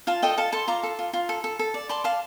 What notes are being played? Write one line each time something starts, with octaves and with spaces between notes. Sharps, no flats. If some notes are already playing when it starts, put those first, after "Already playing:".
F4 F5 A5
A4 D#5 G5
A4 F5 A5
A4 A5 C6
F4 A#5 D6
A4
F4
F4
A4
A4
A4
D5
D5 A5 C6
D5 F5 A5